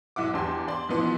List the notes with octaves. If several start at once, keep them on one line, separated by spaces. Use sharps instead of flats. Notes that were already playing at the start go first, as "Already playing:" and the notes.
B1 E4 F#5 D6
E2 D4 G4 C6
D5 C6
B1 E3 F3 B3 C6